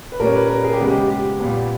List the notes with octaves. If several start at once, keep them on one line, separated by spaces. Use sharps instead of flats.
B4
A#2 G3 A#3 C#4 A#4
B4
A#4
G#4
G4
C#3 G#3 B3
G4
G4
A#2 G3 B3